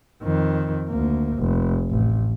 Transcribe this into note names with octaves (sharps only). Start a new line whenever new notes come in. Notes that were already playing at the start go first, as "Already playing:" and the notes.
F2 D#3
D2 A#3
F1
A1